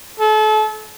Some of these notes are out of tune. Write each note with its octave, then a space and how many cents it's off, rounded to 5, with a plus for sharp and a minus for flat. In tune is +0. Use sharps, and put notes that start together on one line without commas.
A4 -35